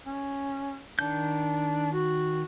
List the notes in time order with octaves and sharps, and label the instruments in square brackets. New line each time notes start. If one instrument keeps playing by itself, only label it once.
[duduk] C#4
[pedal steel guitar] D#3 G6 [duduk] D4
[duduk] F#4